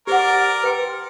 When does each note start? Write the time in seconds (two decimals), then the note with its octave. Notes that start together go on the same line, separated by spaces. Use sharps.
0.07 G4 A#4 C5 D5 F#5
0.63 B4 G5 C6